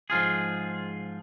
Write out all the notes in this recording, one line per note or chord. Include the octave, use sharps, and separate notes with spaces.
G#2 F3 F4 G#4